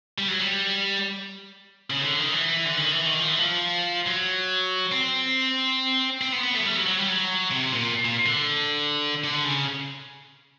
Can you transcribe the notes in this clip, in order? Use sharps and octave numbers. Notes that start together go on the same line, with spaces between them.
G3
F#3
G3
C#3
D#3
D3
D#3
E3
D3
D#3
E3
D#3
F3
E3
F3
F#3
C4
C4
B3
B3
A3
F#3
G3
F#3
F#3
G3
F#3
C3
A#2
A#2
D3
D3
C#3